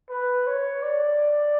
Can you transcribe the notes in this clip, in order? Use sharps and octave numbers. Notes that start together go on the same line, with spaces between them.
B4
C#5
D5